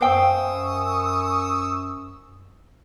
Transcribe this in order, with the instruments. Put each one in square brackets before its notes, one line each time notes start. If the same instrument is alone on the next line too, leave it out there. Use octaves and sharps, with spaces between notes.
[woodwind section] F#2 [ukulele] C5 F5 G5 [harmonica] C#6 D#6 E6